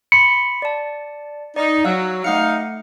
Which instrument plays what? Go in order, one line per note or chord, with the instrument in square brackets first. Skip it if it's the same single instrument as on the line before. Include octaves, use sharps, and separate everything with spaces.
[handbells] B5 C6 B6 [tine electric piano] C#7
[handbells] D5 A5
[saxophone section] D#4 [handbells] D5
[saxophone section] F#3 [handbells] F5 E6 F#6
[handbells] A3 F#5 C#7 [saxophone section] D#4 F5